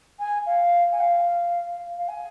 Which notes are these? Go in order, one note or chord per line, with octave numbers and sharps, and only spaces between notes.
G#5
F5
G#5
F5
F5
G#5